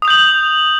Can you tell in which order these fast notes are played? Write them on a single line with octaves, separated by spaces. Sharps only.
D#6 F7 G6 F#7